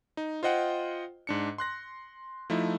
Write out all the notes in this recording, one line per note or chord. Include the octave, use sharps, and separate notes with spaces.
D#4
F4 C5 D#5 F#5 G5
G#2 D4 C#7
C6 F#6 A#6
F3 A3 D#4 E4